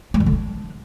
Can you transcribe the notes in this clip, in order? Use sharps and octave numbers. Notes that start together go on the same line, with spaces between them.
G#3
D#3
D3
D4